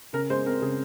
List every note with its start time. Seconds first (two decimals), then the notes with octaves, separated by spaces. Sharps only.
0.13 C#3 A#4
0.30 G#3 C5
0.46 C4 A#4
0.62 C#3 G#4